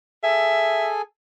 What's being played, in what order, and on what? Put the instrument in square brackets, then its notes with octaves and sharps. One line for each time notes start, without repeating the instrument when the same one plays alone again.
[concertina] G#4 A4 G#5 [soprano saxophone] E5